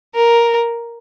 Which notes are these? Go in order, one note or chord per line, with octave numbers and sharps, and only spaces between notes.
A#4